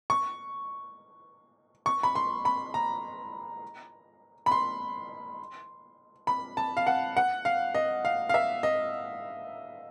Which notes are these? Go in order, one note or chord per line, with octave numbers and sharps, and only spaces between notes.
C#6
C#6
B5
C6
B5
A#5
B5
C6
B5
A5
F5
F#5
F#5
F5
D#5
F5
F5
E5
D#5